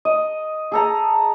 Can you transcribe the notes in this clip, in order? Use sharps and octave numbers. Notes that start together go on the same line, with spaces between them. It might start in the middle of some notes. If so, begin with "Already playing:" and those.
D#5
G#4 A4 A#5